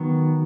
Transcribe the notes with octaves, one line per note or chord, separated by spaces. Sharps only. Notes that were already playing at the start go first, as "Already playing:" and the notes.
Already playing: D#3 F#3 B3